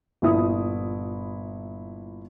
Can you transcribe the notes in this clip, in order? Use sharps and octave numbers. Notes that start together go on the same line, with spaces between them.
G1 A#2 F3 E4 D#6